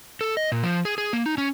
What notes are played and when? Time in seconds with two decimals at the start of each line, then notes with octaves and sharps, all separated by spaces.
0.21 A4
0.37 D#5
0.52 A#2
0.64 F3
0.85 G#4
0.98 G#4
1.13 A#3
1.26 D#4
1.38 C#4